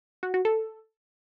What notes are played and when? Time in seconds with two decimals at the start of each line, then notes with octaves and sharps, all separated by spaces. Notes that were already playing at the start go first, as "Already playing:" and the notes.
0.23 F#4
0.34 F#4
0.45 A4